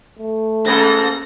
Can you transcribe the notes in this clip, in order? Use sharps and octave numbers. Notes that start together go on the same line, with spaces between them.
A3
G#2 A#3 C#4 A4 A#6